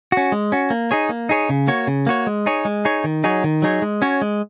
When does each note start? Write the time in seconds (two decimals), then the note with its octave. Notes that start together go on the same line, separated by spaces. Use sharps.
0.12 C#4 F#4
0.32 G#3
0.52 C#4 F#4
0.70 A#3
0.91 D#4 G#4 C#5
1.09 A#3
1.29 D#4 G#4 C#5
1.49 C#3
1.67 A#3 F#4 C#5
1.87 C#3
2.07 A#3 F#4 C#5
2.27 G#3
2.46 D#4 G#4 C#5
2.65 G#3
2.85 D#4 G#4 C#5
3.04 D#3
3.24 F#3 D#4 G#4 C#5
3.44 D#3
3.62 F#3 D#4 G#4 C#5
3.82 G#3
4.02 C#4 F#4 C#5
4.22 G#3